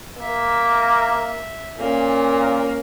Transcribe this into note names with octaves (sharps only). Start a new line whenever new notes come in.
A#3 E5
A#2 A#3 C#4